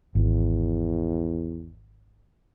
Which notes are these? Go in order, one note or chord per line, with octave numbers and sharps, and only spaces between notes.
G#1 E2